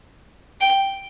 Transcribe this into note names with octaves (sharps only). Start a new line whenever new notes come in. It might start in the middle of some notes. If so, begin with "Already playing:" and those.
G5